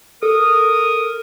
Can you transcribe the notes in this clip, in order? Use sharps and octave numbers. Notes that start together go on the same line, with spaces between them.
A4 A#4 D#6